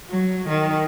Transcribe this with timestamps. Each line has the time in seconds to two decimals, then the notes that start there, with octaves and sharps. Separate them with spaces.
0.10 F#3
0.49 D#3